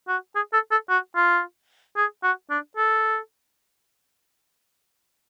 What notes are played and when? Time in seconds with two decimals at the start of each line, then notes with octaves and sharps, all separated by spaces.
0.08 F#4
0.35 G#4
0.53 A4
0.71 A4
0.90 F#4
1.16 F4
1.97 G#4
2.23 F#4
2.50 D4
2.77 A4